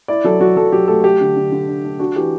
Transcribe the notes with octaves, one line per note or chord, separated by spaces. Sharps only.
E4 D5
F#3 A4
F#3 F#4
F#3 A4
F#3 G4
A3 A4
A3 G4
D3
D3
D3
D4
D4
D4 F#4
E3 G4